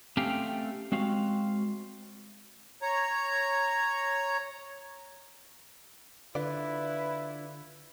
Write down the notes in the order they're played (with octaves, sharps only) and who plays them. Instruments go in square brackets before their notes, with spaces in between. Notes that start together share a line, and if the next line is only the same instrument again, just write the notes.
[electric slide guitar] A3 C4 C#4 G4 F5 G5
G#3 C4 F#4 F5
[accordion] C#5 A#5
[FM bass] D3 [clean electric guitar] D4 F4 D5 [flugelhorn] E4 [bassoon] B4